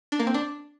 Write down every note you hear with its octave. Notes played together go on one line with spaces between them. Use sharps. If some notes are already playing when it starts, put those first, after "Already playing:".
D4
A#3
C4
D4